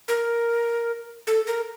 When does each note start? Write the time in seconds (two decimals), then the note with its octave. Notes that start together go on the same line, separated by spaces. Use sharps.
0.08 A#4
1.27 A4
1.47 A#4